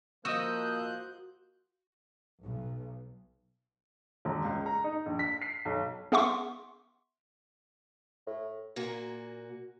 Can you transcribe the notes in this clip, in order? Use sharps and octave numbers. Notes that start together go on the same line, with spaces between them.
F3 A#3 F#4 D#5 D#6 E6 F#6 G6
B1
E1
C#2
A#5
D#4
A#1
B6
C7
B1
B3 G#4 E5 F#5 C6 C#6
A2
A#2 A#3 F#4 G#5